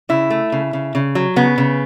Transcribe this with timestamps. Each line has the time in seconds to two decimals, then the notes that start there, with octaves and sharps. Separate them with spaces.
0.09 C#3 E4
0.30 A3
0.52 C#3
0.73 C#3
0.95 C#3
1.15 F#3
1.36 C#3 B3
1.58 C#3